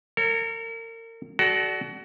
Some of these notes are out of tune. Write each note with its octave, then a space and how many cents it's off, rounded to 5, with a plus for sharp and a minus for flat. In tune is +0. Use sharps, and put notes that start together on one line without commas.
A#4 -35 C#5 -5
F#4 +25 A4 -30 D5 +0